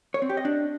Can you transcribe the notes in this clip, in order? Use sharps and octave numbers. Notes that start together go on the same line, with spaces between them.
C#5
C4
G4
D#5
D4